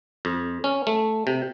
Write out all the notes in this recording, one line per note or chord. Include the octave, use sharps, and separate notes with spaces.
F2
C#4
A3
C3